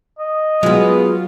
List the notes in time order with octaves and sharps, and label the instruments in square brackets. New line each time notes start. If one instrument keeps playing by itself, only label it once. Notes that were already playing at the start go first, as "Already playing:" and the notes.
[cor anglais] D#5
[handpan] F#3 F#4 [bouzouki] G#3 B3 [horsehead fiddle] F4